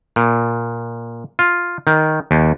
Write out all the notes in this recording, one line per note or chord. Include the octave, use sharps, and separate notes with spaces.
A#2
F4
D#3
D#2